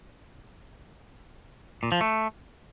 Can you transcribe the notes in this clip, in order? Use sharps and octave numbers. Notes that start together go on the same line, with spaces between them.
A#2
F3
A3